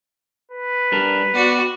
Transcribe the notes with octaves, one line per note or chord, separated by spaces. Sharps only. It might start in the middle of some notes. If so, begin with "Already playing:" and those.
B4
G3 D4 A#4
B3 F#4 D5